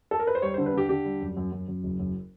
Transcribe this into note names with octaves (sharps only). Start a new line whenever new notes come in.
A4
A#4
B4
C5
G3 C#5
C5
D3
B4
D3 G4
D3 G4
G3
F#2
F#2
F#2
F#2
F#1
F#2